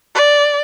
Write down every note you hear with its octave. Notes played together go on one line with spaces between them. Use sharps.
D5